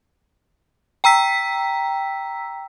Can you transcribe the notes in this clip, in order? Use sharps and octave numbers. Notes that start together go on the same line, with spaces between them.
G5 A#5 E6 B6